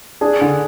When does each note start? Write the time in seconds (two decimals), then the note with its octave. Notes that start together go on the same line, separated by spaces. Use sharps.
0.21 D4 G#4
0.41 D3